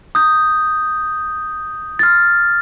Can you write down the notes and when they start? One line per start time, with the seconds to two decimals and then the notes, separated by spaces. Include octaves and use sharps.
0.15 D#6 G6
1.99 F6 A6